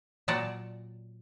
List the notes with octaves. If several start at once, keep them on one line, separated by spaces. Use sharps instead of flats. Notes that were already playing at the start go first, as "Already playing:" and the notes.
A#2 F#3 D5 F#5 A5 A#5